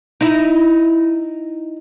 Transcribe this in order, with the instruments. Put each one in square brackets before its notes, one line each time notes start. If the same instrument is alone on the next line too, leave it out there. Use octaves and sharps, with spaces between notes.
[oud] D#4 E4